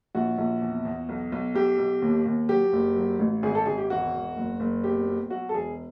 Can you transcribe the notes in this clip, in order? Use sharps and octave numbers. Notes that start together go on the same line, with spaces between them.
A#1 F#4
A#1
E2
E2
B1
B1
B1 G4
B1
D#2
D#2
F#3 G4
F#1
F#3
A1
G#1 G#4
A4
G#1 G#4
G4
E1 F#4
E1
F#1
F#1
B1 G4
B1
F#3 F#4
A4
E1 G#4